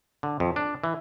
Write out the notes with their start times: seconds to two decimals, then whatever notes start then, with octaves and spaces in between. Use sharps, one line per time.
0.23 D3
0.40 F2
0.56 D4
0.84 E3